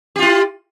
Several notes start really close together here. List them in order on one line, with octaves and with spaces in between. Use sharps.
G4 F4 E4